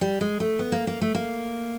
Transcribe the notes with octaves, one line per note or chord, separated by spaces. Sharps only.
G3
G#3
A3
B3
A#3
A#3
A3
A#3